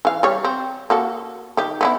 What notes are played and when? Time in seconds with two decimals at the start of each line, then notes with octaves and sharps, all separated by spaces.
0.05 E3 F5
0.23 G3 C#5
0.45 C4
0.90 A#3 F#4 A4
1.57 D#3 G4
1.81 B3 C4 E4